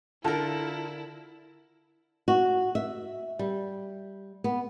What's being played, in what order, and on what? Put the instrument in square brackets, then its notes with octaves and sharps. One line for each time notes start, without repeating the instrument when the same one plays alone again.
[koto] D3 A#4 [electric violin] E4 [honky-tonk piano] F4 A4 A5
[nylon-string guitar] F#4
E5
G3
B3